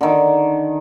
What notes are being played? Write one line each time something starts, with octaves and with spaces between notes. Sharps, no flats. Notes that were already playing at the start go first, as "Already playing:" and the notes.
D3 D#3